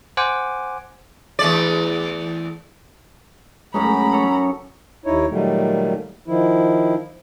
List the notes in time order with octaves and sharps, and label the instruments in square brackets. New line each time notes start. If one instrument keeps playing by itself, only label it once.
[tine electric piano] C5 F#5 G#5 D6
[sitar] E2 A3 D5
[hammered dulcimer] F#2 C#4 D#4 [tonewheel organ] G#3 A3 [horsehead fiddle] A#5 B5
[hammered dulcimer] A4 C#5
[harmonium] D#2 D#4 E4 C#5
A#2 D#3 F#3 G3 A3
D#3 F3 E4